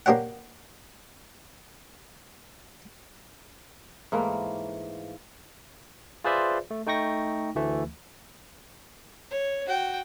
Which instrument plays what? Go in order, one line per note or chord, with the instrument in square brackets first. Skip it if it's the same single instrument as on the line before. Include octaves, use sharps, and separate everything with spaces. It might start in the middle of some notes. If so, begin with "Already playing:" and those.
[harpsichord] A#3 D4 G4 C#5 F#5
[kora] G#2 E3 A3 A#3
[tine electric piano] F4 G#4 B4 C5 D5 E5
A3
A3 D#4 G5 C#6 A#6
D2 E3 A3
[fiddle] C#5
F#4 G5